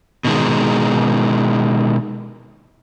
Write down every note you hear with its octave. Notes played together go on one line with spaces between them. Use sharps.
B2 D#3 G#3